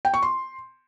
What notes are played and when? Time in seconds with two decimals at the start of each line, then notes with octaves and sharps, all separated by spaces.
0.05 G5
0.14 C#6
0.22 C6